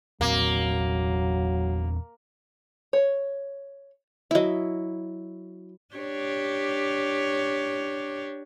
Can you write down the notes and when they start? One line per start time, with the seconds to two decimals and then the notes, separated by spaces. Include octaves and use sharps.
0.21 E2 A#2 F#3 A#3 C4
2.93 C#5
4.31 F#3 E4 D#5 E5
5.95 D4 G4 C#5